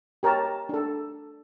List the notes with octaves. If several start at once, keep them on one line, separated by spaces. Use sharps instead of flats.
G4 A#4 C#5 A5
D4 A4